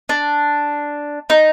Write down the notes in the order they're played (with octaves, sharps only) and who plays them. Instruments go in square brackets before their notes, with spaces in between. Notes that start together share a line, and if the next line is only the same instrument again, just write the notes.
[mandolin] D4
D#4